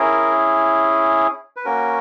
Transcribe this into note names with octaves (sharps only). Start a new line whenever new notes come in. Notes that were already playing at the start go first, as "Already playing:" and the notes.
Already playing: C#4 E4 G#4 A#4
B4
A#3 C#4 F#4 A#4